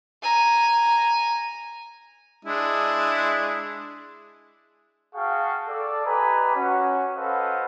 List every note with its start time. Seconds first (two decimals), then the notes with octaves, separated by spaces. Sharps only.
0.22 G#5 A#5
2.45 G#3 D4 E4
5.15 F#4 G#4 F5 G5 A5 C#6
5.69 A4 D5
6.05 G4 B4 D#5 G#5 A#5
6.55 C#4 F#4
7.16 A4 B4 C5 D#5 F5 F#5